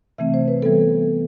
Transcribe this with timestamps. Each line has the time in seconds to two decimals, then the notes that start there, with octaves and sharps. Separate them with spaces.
0.18 C3 E3 A3 C4 E5
0.34 C5
0.48 B4
0.62 E3 G3 B3 A4